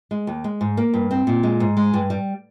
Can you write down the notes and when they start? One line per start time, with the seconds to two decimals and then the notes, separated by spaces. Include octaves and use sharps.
0.11 G#3
0.27 D#2
0.44 G#3
0.61 G#2
0.77 A#3
0.94 G2
1.11 C4
1.27 A#2
1.43 G#3
1.60 G#2
1.77 G#3
1.94 G2
2.10 G3